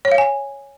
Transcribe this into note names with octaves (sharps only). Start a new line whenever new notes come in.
C#5
F5
G#5